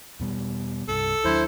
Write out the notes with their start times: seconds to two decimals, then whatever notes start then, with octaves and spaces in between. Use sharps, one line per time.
0.19 E2 B2 G3
0.88 C2 G2 A4
1.24 D#2 F#3 D4 E4 C5